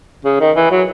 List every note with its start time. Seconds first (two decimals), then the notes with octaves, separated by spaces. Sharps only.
0.25 C#3
0.40 D#3
0.56 E3
0.71 F#3